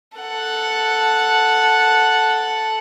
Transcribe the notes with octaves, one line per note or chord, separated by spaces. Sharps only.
A4 F#5